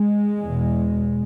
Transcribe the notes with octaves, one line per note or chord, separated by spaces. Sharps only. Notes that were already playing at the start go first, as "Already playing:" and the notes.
Already playing: G#3
E2 B2